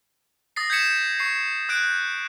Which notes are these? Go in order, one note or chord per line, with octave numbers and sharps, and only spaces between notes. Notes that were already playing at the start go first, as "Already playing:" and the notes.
D#6 A6 A#6 C7
G6 G#6 B6 C#7 E7
C#6 C7
D#6 F#6 G6 D7